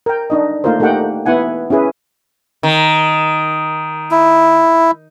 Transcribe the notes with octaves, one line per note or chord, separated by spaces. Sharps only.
A#4 G5
D4 D#4 D#5
A3 A#3 D#4 F4 A#4 C5
A3 A#3 D#4 G4 F#5 G5
B3 E4 F#5 G#5
C#4 E4 G#4 B4
D#3
E4